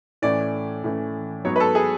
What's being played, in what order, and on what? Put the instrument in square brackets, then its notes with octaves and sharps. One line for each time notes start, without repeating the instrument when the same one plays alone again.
[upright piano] A2 E3 A3 C#4 [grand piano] D5
[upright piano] A2 E3 A3 C#4
[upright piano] G#2 F#3 B3 [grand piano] C#5
[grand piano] B4
A4
G#4